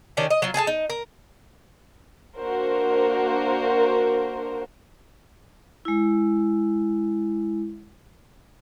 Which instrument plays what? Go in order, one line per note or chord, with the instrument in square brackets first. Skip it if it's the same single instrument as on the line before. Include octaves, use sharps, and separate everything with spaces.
[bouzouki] D#3 C#4 D4 G4
D#5
F#3 F4
G#4 A4 G5 A5
D#4
A#4
[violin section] A#3 D4 F#4 A#4 C5
[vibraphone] G#3 E4